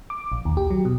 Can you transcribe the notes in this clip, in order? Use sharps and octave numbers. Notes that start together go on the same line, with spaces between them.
D6
A#1
D#2
G4
F#3
B2